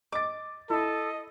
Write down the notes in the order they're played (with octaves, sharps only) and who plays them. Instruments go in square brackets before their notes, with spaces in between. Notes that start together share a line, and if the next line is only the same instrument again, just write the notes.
[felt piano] D#5 A6 [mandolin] D6
[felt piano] E4 [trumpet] A4 [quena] D#5